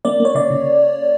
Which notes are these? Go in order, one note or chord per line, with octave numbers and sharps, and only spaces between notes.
A#3 D5
A#3
C#5
C#3 D5
C#3